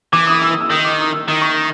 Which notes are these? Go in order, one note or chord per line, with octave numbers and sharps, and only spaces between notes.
E3 D6
D#6
E6
D#6
E6
D#3 D#6
D6
D#6
E6
D#3 D#6
C#6